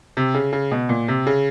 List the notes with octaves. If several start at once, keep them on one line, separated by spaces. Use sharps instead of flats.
C3
C#3
C#3
B2
A#2
C3
C#3